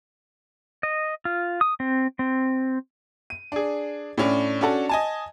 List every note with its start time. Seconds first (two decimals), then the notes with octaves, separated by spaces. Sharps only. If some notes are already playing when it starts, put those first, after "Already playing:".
0.83 D#5
1.25 F4
1.61 D#6
1.80 C4
2.19 C4
3.30 D#7
3.52 D4 G#4
4.18 A2 C#4 D4
4.61 C#4 D4 F#4 A4
4.89 D#5 G#5 A5